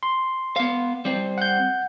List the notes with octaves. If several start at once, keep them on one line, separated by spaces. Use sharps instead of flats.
C6
B3 F5
G3 C4
F#5 G6